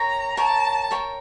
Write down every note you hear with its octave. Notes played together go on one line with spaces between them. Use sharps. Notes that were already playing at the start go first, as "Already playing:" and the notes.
Already playing: A#4 C#5 G5 A#5 C#6
A#4 C#5 G5 A5 C#6
A#4 C#5 G5 C#6